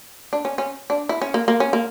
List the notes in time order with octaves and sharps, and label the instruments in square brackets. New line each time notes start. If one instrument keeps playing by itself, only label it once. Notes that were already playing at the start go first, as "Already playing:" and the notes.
[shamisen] D4
C#4
C#4
D4
E4
C#4
A#3
A#3
C#4
A#3